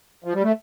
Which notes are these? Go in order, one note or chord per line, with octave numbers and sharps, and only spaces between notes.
F3
G3
A3